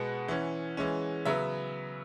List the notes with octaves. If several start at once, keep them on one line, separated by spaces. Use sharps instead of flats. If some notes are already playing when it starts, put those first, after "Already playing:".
Already playing: B2 G#3 B3 F#5
E3 C#4
E3 G#3 C#4
C#3 F#3 B3 E5